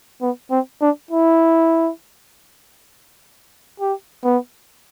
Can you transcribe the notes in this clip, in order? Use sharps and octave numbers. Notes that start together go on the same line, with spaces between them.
B3
C4
D4
E4
G4
B3